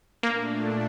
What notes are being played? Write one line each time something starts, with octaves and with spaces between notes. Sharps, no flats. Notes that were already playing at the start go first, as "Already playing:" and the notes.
A#2 A3 A#3 D4